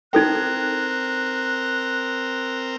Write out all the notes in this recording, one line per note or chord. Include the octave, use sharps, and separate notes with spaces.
C4 D#4 A4 A#4 G5 F#6